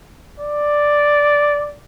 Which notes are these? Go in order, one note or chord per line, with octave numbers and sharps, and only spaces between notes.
D5